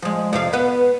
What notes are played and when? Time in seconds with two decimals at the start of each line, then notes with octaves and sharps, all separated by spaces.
0.02 F3 G#3
0.33 F2 C3 F5
0.53 B3 B4